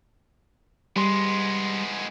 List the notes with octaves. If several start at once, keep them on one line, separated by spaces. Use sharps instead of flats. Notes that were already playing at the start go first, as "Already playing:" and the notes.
G3 G#3 B3 C6